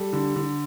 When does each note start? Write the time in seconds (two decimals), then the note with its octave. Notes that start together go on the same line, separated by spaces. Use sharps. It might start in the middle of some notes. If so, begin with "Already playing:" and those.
Already playing: G3 A4
0.13 D3
0.36 D3